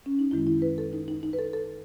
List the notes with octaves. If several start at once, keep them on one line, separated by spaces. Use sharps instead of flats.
C#4
D#4
F#2 D#3 G#3 E4
E4
B4
A4
D#4
D#4
D#4
B4
A4
A4